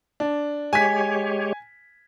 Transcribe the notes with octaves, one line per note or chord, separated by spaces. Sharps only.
D4
G#3 G4 C#5 G#5 B6